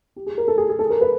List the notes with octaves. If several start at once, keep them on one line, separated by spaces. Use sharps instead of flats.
G4
G#4
A#4
A4
G#4
G#4
A4
A#4
B4